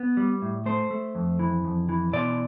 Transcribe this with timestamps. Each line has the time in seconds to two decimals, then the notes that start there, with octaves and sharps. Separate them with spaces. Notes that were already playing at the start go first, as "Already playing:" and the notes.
Already playing: B3
0.17 G3
0.42 A2
0.66 A3 C5
0.91 A3
1.15 F2
1.39 E3
1.65 F2
1.89 E3
2.13 B2 D5